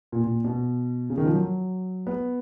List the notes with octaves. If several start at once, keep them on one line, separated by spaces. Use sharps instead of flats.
A#2
A#2
B2
C#3
D#3
F3
F#3
B3